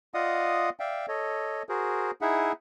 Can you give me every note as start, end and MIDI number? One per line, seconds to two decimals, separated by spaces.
0.14 0.70 65
0.14 0.70 74
0.14 0.70 75
0.14 0.70 77
0.14 0.70 78
0.14 0.70 87
0.80 1.06 74
0.80 1.06 76
0.80 1.06 77
0.80 1.06 79
1.08 1.63 69
1.08 1.63 73
1.08 1.63 75
1.69 2.11 66
1.69 2.11 68
1.69 2.11 70
1.69 2.11 72
2.21 2.52 63
2.21 2.52 64
2.21 2.52 68
2.21 2.52 76
2.21 2.52 78